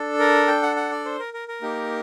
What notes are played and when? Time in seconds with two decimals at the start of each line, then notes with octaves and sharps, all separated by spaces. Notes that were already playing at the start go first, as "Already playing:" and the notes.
Already playing: D4 A4
0.19 A#4
0.48 G5
0.62 F#5
0.76 F#5
0.91 D5
1.05 C5
1.19 A#4
1.34 A#4
1.48 A#4
1.61 A#3 D#4 G4